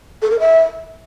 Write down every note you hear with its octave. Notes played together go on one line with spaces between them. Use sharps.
A4
A#4
E5